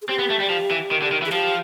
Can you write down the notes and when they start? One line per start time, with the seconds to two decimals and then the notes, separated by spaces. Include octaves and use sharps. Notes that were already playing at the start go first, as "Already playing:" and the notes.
0.02 G#4
0.09 C4 G4
0.19 B3
0.30 A3
0.40 G3
0.50 F3
0.71 E3
0.91 D#3
1.02 D3
1.12 D#3
1.22 E3
1.26 G#4
1.32 F3 G4